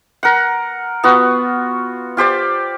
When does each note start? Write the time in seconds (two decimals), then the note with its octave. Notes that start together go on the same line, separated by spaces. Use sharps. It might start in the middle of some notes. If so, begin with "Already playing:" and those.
0.23 A#4 F#5
1.03 B3 F4 F#4
2.17 F4 G4 C5 D5